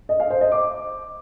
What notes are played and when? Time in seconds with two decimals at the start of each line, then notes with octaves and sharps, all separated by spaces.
0.09 D#5
0.20 F5
0.30 C5
0.41 D#5
0.52 D6